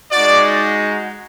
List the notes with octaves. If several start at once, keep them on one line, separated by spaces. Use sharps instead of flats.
G#3 D#4 F#4 D5